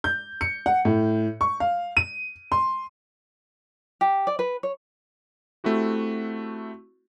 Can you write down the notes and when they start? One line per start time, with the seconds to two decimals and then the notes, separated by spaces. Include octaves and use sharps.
0.04 G6
0.41 C#7
0.66 F#5
0.85 A2
1.41 C#6
1.60 F5
1.97 D#7
2.52 C6
4.01 G4
4.27 D5
4.39 B4
4.63 C#5
5.64 A3 C4 E4 F#4 G4